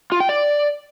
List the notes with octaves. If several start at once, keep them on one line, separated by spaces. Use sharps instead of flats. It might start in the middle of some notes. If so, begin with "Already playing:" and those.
F4
G5
D5